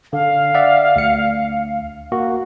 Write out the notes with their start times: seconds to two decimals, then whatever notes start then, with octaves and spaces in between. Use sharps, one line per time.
0.13 D3 F5
0.54 D5 E5 F#5
0.96 D2 C#7
2.12 A#3 F#4